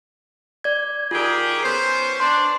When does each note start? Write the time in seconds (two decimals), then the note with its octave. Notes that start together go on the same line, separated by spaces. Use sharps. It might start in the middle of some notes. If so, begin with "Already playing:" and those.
0.64 D5 G#6
1.11 D#3 F4 G4 G#4 A#4
1.63 B3 C#4 C5 G6 C7
2.20 D4 C6